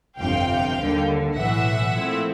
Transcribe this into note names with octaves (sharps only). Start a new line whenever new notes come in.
G1 F2 C3 F5 G5
D#2 D3 G3
B1 A2 E3 E5 F#5
A#2 F3 A3 C4 E4